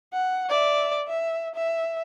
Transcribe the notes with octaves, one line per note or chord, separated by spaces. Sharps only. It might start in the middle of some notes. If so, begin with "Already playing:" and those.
F#5
D5 E5
E5
E5